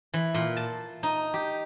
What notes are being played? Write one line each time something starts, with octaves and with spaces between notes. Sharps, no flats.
E3
A#2
A5
D#4
G4